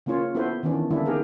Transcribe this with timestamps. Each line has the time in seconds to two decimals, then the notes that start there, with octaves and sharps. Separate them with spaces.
0.06 C#3 A#3 C#4 F4 C#5
0.35 B3 E4 F#4 A4 B4 C5
0.63 D#3 E3 B3 C#4 D4
0.90 D3 G3 A#3 C#4 D4 E4
1.06 B3 D#4 G4 G#4 A#4